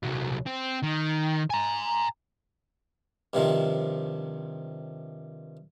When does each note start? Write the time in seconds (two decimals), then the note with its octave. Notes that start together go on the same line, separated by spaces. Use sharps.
0.03 C2 F#3
0.46 C4
0.83 D#3
1.50 G#5 A#5
3.33 G2 C3 D#3 F3